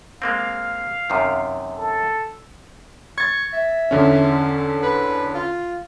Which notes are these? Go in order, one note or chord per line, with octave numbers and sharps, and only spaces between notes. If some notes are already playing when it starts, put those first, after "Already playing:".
G#3 A#3 C4 F5
F#2 C3 D#3
A4
C#6 G#6 A6
E5
E2 D3 C#4
B4
F4